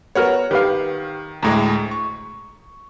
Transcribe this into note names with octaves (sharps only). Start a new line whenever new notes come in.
B3 F#4 A#4 C#5 F#5 F6
D#3 G4 B4 F5
D2 A2 G#3 A#5
C#6